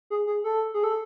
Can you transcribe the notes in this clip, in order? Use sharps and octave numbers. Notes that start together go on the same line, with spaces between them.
G#4
G#4
A4
G#4
A4